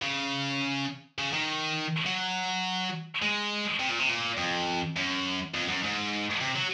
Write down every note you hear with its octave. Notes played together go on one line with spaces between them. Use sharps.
C#3
C#3
D#3
F#3
G#3
C3
A#2
C3
A#2
F2
F#2
F2
F#2
G#2
C3
F#3